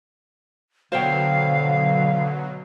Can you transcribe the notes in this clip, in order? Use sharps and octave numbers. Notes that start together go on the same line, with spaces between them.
B2 D3 F#3 C5 C#5 F5 G5